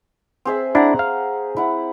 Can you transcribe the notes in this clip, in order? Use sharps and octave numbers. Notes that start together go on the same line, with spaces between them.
C4 G#4 E5
D4 E4 F#5 A#5
F5
E4 F#5